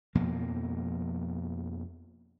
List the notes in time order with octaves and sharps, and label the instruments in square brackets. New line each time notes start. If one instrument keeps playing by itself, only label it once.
[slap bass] F2 B2 F3 A#3